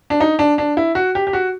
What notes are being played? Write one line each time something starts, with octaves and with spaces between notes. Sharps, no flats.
D4
D#4
D4
D4
E4
F#4
G4
G4
F#4